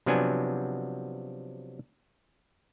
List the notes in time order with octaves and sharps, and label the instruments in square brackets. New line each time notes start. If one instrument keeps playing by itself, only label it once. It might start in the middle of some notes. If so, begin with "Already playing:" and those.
[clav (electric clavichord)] C3 F3 F#3 B3 D4 G#5